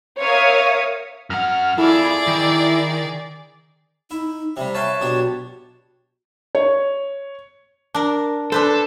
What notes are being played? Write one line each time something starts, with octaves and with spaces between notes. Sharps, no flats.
A#4 C#5 E5 F5 D#6
F#2 F#5 F6
E4 F4 G#4 A4 D5
D#3
D#4 E4
C3 G3 E5
B4 C#5 F5 A5 C6
B1 D4 F#4 G4
C#5
D4 A#4
D4 A4 B4 C5